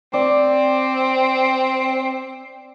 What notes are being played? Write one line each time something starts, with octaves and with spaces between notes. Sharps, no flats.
C4 D5